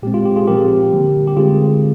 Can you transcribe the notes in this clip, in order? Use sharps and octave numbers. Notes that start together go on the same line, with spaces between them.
A#2 G#3 C4 G4
F4
G4
F4 G#4
A#2 F3 C4 G4 A#4
D3 G3 A#3
G4
D3 G#3 C4 F4 G#4